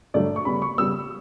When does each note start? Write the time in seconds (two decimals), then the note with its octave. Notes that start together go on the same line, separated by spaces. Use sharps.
0.14 G2 D3 F#3 A3 D5
0.36 C#6
0.45 C#3 G3 B3 B5
0.62 C#6
0.78 C#3 G3 B3 E6